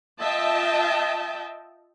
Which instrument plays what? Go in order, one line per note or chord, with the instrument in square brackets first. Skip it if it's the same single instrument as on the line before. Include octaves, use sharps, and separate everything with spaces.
[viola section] F4 D#5 E5 G5 A5